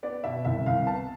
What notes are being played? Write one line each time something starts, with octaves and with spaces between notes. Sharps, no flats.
B3 D5
B2 E5
C2 E5
C2 F5
B3 A5